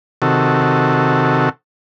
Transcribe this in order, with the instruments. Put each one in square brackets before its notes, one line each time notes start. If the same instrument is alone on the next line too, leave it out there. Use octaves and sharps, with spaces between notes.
[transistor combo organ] C3 D#3 F#4 A4